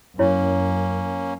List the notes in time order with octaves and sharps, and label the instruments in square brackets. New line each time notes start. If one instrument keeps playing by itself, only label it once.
[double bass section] F#2 [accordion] A#3 C#4 [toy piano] E4 C#5